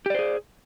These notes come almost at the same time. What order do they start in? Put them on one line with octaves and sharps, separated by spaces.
G4 D5 C5 G#4